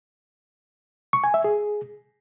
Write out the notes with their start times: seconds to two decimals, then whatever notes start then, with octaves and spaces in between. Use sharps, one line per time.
1.13 C#6
1.24 G#5
1.34 E5
1.44 G#4